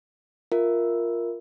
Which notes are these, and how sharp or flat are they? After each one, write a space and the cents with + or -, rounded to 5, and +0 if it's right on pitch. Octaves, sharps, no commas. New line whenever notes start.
F4 +0 A#4 +0 E5 +0